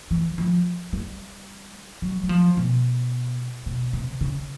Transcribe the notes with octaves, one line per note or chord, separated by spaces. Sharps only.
E3
F3
G3
F#3
F#3
F3
B2
B2
C3
C#3